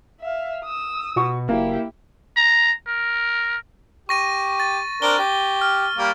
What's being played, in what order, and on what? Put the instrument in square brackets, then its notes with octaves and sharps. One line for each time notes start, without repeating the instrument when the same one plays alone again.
[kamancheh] E5 F5
D#6 E6
[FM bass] B2 [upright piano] F#4 C#6
[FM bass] F#1 [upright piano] A#3 [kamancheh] E4 G4
[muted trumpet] A#5
A#4
[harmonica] G4 [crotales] C#6 A#6 D#7
[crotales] A6
[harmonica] C4 D4 A#4 [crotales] G7
[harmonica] G4
[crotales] F6
[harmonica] G3 A#3